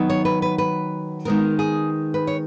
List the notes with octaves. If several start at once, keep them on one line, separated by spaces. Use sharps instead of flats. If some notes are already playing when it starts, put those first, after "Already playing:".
Already playing: D#3 F#3 B3
C#5
B4
B4
B4
D#3 G#3 B3 A#4
G#4
B4
C#5